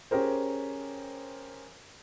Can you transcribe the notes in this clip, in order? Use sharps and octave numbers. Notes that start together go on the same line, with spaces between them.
C#4 G4 G#4 A#4 C5